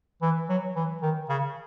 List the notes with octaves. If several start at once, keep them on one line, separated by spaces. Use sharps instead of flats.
E3
F#3
E3
D#3
C#3